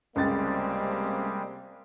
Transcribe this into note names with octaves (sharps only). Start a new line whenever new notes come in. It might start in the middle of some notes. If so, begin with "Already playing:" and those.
C#2 C3 G3 G#3 A#3 C4 A6